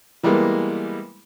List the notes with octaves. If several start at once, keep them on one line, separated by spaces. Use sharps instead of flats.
E3 G3 G#3 A#3 B3